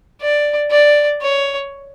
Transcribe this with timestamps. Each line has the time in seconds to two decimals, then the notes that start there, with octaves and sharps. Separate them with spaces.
0.21 D5
0.71 D5
1.21 C#5